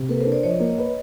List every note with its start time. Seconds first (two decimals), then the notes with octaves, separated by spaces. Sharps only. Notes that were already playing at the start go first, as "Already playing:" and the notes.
Already playing: C3
0.08 A#3 A4 B4
0.21 A#4 C5
0.26 D4
0.32 C5 D5
0.43 F3 C#5 D#5
0.60 A#3
0.78 B4